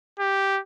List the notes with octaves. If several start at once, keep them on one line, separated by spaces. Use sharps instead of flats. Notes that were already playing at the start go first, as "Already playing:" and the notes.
G4